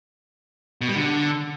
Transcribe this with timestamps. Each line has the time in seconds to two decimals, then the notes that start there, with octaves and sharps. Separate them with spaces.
0.81 B2
0.89 G3
0.96 D3